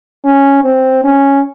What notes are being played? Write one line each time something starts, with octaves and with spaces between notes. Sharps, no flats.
C#4
C4
C#4